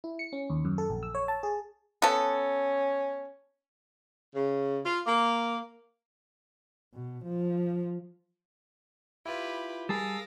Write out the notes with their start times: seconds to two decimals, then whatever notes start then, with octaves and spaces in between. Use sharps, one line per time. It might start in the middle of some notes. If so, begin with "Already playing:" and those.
0.04 E4
0.19 C#7
0.33 C#4
0.50 D#2
0.65 F#2
0.78 A4
0.90 A#1
1.03 E6
1.15 C#5
1.28 A5
1.43 G#4
2.02 B3 C#4 A4
4.35 C#3
4.85 F4
5.06 A#3
6.94 B2
7.24 F3
9.26 E4 F4 G4 B4
9.89 G3 G#4 A#4 F5 A5 D#6 E6 A#6